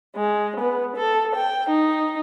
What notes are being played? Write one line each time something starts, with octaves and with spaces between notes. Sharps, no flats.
G#3
B3
A4
G5
D#4